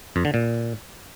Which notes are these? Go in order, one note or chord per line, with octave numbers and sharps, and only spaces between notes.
F2
D3
A#2